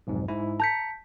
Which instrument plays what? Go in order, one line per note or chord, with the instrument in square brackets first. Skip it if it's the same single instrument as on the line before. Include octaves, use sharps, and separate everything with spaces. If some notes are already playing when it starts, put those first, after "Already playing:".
[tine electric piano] B1 F2 G#2
G#2 E4
[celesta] A5 G6 B6 [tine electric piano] A#5 C#7